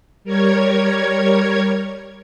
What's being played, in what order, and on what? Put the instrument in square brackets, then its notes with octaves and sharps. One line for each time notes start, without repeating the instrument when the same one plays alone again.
[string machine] G3 A#4 C#5 G#6